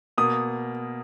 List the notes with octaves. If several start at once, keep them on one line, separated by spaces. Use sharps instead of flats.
B2 A#3 D#6